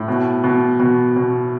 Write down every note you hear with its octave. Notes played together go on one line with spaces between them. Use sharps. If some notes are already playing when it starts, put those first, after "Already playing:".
Already playing: A2
B2
B2
B2
B2